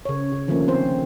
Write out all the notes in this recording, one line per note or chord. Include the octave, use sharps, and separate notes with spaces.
C#3 C#5
C#3
D3 D#3 F3 A3 A#3 C#4
B3 C4 C5